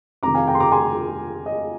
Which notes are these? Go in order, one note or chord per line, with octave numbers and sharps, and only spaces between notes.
F2 C3 D#3 A#5 D6
F5 G#5
G5 A#5
C6
A#5 D6
G#5 C6
D#5